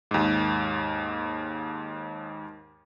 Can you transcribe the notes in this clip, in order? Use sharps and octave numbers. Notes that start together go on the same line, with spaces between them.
D#2 G#2